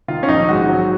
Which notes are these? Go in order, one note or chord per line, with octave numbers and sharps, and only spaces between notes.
D#3 F4
C#4
A#1 D#4
G#2 F#4
F#3